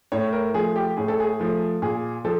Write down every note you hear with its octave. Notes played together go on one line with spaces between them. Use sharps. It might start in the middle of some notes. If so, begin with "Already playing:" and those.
A2 C#5
A#4
F3 A3 G#4
G4
A2 G#4
A4
G#4
F3 A3
A#2 G#4
F3 A4